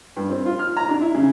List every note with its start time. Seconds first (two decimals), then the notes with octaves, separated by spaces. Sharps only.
0.16 G2
0.30 C4
0.46 F4
0.59 F6
0.77 A#5
0.88 D4
1.01 E4
1.14 C#3